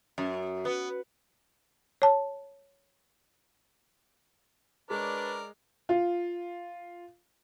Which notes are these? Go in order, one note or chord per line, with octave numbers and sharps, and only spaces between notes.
F#2
B3
C#5 A5
G#3 D4 A#4 B4 C#5 D5
F4